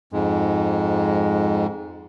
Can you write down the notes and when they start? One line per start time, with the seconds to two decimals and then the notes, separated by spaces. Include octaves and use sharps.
0.13 F2 G#2 G#3